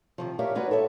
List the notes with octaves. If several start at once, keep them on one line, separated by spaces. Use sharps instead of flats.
C3 D#3 F3
G4 A#4 C#5 D5 E5 F5
G#3 D#4 F#4 B4 C#5 D5
A4 C#5 E5